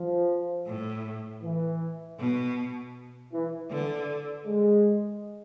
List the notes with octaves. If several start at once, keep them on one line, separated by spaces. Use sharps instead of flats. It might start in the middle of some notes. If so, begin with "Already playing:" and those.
Already playing: F3
A2
E3
B2
E3
D3 E3
G#3